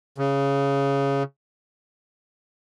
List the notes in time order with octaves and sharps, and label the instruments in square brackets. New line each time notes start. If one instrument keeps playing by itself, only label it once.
[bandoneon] C#3